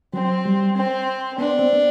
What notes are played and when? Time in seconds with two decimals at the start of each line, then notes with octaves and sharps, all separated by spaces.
0.13 F#3 C4
0.45 G3
0.76 C4
1.38 B3 D4
1.59 C4
1.73 B3